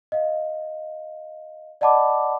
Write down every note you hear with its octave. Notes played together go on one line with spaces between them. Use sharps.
D#5 F5
D5 D#5 F#5 A5 B5 D6